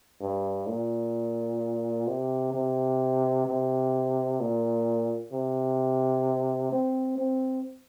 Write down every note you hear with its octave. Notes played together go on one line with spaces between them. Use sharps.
G2
A#2
C3
C3
C3
A#2
C3
C4
C4